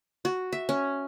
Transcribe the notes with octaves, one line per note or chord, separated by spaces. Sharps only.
F#4
E5
C#4